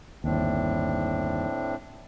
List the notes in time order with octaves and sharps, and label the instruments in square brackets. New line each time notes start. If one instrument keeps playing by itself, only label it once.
[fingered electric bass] G1 D#2 [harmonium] A2 C4 D4